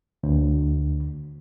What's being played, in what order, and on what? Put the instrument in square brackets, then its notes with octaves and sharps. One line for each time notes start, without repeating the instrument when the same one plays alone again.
[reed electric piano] D2